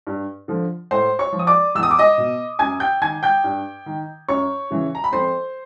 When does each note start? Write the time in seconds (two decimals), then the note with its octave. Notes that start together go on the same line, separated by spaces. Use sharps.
0.07 G2
0.48 D3 F3
0.91 A2 C5 C6
1.19 C#5 C#6
1.33 F3
1.39 D#6
1.47 D5 D6
1.75 E2 E6
1.83 D#6
1.91 D6
1.99 D#5 D#6
2.18 B2
2.59 F#2 G#5 G#6
2.80 G5 G6
3.02 D#3 G#5 G#6
3.23 G5 G6
3.44 G2
3.86 D#3
4.29 F#2 C#5 C#6
4.71 C#3 E3
4.95 A#5
5.04 B5
5.12 F2 C5 C6